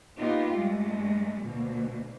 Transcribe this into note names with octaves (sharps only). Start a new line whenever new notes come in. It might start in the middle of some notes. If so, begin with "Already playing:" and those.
A#3 B3 D#4 F4 G4
G2 G#3 A3
D2 B2 A#3